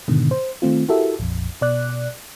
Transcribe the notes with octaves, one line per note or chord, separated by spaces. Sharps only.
G#2 B2 D3 D#3
C5
D#3 A3 C4 F4
E4 F#4 G4 A4 A#4 E5
A#1 F2
B2 D5 F#6